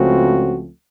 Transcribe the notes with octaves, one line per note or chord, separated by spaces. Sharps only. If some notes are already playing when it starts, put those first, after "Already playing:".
Already playing: C#2 C#3 F3 A3 C4 F#4